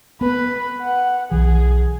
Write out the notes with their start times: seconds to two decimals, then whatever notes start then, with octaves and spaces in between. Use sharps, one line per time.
0.21 B3 B4
0.81 F#5
1.31 B1 E3 G#4